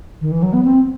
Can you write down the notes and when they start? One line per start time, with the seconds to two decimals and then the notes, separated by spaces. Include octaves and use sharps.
0.21 D#3
0.32 E3
0.43 F#3
0.53 B3
0.64 C4